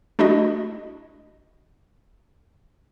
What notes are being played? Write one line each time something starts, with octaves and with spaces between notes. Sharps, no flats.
A3 D4 E4 F#4 D#5